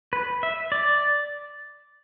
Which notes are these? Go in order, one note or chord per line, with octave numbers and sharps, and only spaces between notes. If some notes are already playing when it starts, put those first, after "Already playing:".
B4
E5
D5